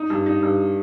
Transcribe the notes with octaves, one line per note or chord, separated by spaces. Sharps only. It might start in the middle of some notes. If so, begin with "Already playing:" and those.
Already playing: D#4
G2
D#4
G2